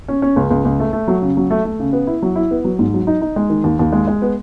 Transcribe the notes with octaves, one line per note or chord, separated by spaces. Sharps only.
C#4
C#4
C#2
C#2
C#2
A3
A3
F#3
C#3
F#3
A3
A3
C#3
B3
E4
F#3
E4
B3
F#3
G#2
F#3
D#4
D#4
G#3
D#3
D#2
D#2
G#3
G#3
B3